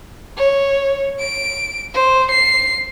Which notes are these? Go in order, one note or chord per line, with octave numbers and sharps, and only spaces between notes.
C#5
D7
C5
C7